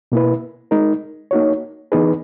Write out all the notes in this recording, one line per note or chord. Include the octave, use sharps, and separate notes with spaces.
B2 A#3 E4 B4
G#3 D#4 A#4
A#3 D#4 F#4 C#5
E3 B3 D#4 G#4 B4